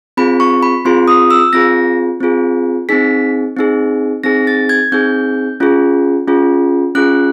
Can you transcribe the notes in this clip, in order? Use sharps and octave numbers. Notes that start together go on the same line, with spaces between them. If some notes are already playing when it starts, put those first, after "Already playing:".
C4 F4 G#4 B5
C#6
B5
C4 F4 G#4 C6
D#6
E6
C4 F4 G#4 A#6
C4 F4 G#4
C4 D#4 G#4 B6
C4 D#4 G#4
C4 D#4 G#4 A#6
A6
G#6
C4 D#4 G#4 G6
C#4 F4 G#4
C#4 F4 G#4
C#4 F4 G#4 F#6